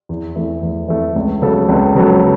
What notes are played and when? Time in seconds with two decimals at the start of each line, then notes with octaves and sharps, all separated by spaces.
0.09 E2
0.36 E3 A3
0.63 E2
0.88 E3 A3
1.16 C#2
1.42 C#3 F#3 B3 A4
1.69 C#2
1.95 C#3 F#3 B3 A4